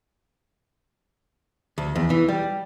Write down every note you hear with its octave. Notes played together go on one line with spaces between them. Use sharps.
D2
E2
E3
G3